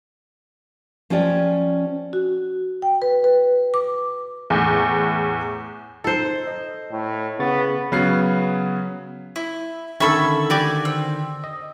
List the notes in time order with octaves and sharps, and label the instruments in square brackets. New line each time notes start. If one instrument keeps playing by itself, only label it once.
[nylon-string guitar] F3 C#4 F4 G4 C#5 D5
[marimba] F#4
G5
B4
B4
D6
[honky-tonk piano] E2 A2
[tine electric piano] D#4 [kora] A4 C5
[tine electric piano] D#5
[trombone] A2
[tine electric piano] C#3 C#6 A6 [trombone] B3
[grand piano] C#3 F#3 B3 C#4 F#6 C7
[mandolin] E4
[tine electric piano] D3 D#3 [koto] C#4 A4 [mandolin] E5 B5 E6
[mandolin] F#4 [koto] G4 D5 G#5
[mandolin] C4
[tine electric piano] D#5